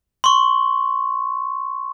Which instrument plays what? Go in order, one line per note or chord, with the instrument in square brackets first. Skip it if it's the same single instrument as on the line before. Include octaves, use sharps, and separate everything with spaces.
[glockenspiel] C6 C#6